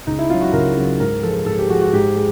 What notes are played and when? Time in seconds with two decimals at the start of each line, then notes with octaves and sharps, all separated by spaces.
0.07 C#2 D#4
0.19 E4
0.30 C#3 F#3 F4
0.41 F#4
0.53 C#2 A#4
0.77 C#3 F#3
1.00 G#2 A#4
1.23 F3 G#3 A4
1.46 G#2 A4
1.59 G4
1.70 F3 G#3 F#4
1.81 F#4
1.93 G#2 G4
2.16 G#3